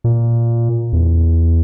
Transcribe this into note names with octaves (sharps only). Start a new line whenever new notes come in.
A#2
E2